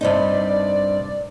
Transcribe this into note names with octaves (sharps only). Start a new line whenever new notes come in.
G2 C3 D#4 D5